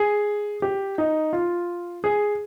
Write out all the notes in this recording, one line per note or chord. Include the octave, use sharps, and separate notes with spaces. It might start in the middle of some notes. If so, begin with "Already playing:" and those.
Already playing: G#4
G4
D#4
F4
G#4